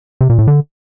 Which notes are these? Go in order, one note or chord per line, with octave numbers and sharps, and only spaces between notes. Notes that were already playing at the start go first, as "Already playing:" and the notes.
C3
A#2
A2
D3